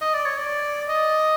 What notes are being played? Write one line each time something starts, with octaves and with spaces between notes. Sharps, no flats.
D#5
D5
C#5
D5
D#5